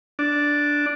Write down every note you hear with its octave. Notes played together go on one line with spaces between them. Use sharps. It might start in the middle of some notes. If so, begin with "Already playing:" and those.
D4